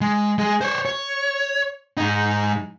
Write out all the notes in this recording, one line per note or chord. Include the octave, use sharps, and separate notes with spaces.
G#3
G#3 G#4
C5 C#5
C#5
G#2 D#4